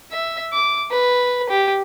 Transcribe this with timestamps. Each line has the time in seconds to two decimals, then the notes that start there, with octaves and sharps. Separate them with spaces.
0.12 E5
0.53 D6
0.91 B4
1.50 G4